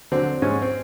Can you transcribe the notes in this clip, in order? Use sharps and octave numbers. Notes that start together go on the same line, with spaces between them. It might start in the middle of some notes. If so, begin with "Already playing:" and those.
D3 F#3 C4
G#2 C#4
C4